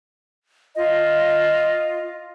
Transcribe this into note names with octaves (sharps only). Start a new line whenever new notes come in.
F4 D#5